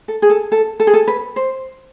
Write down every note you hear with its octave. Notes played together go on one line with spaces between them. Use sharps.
A4
G#4
A4
A4
A4
G#4
A4
B4
C5